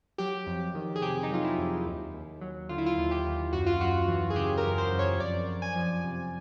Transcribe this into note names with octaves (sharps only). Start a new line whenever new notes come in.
F#3 G4
F2
D#3
G#4
C3 G4
D#4
F#3 F4
E4
F2
D#2
D#2
F#3
D3 F4
E4
F4
D#2
G4
D#2
F#2 F#4
F4
F#2 F#4
E3
G#4
C#3 G4
A#4
F#2
C5
F#2
C#5
F2 D5
F2
G#5
F3
C3